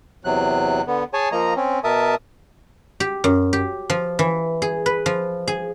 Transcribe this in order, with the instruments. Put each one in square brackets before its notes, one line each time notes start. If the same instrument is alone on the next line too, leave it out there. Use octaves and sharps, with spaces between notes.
[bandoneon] E2 C3 F#3 F#6
D3 B3
G#4 C#5 G#5 A5
F3 A#3 D#5 A#5
C4 C#4
B2 A#4 E5 A5 D#6
[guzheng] G4
F#2
G4
F3
E3
G#4
B4
F3
G#4